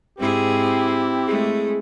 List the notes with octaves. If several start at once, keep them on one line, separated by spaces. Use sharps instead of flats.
G#2 C4 E4 G4 G#4
G#3 A3 G#4